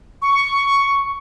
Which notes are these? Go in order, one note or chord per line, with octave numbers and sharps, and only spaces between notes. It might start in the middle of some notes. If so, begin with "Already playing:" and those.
C#6